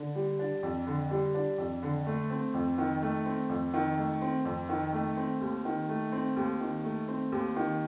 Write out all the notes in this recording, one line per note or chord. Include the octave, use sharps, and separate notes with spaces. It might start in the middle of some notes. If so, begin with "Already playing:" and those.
Already playing: D3
G3
D4
F2
D3
G3
D4
F2
D3
A3
C4
F2
D#3
A3
C4
F2
D#3
A3
C4
F2
D#3
A3
C4
D#2
D#3
A3
C4
D#2
D#3
A3
C4
D#2
D#3